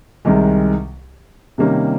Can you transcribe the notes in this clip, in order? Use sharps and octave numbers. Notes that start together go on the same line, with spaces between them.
C2 C3 D#3 G#3
C3 D#3 G3 A#3 C#4